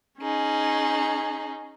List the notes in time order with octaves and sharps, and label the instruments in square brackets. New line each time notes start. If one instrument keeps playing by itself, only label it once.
[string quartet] C#4 D#4 G#4